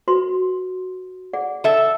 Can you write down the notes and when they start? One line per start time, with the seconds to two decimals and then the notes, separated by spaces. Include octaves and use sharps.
0.08 F#4 B4 C6
1.33 G#4 D5 F#5
1.64 A4 E5